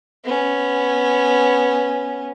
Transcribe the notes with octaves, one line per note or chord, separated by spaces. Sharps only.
B3 C#4